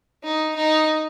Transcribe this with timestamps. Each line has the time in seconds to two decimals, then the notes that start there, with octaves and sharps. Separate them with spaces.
0.23 D#4
0.56 D#4